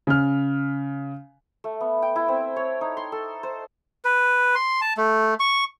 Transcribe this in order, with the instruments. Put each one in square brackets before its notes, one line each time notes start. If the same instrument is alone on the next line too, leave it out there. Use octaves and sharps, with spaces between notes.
[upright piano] C#3 F6
[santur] A3
B3
G5
E4
C4
C#5
D#4
C6
A4
C5
[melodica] B4
C6
A5
A3
C#6